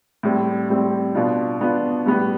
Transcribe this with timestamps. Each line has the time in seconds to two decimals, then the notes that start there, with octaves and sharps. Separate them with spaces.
0.23 A2 G3 C4
0.69 A2 G3 C4
1.15 B2 B3 D4 F4
1.60 B2 B3 D4 F4
2.06 A2 G3 B3